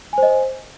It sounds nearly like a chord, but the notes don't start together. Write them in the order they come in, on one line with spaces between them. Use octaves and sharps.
G#5 C5 D#5